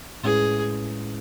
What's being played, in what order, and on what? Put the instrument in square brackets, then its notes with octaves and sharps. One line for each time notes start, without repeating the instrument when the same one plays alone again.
[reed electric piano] A2 G#3 C#4 E4 B4 [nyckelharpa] G#4